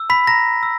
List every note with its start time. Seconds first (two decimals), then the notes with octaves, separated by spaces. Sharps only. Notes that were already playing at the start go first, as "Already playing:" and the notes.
Already playing: E6
0.10 B5 B6
0.27 A#5 A#6
0.63 E6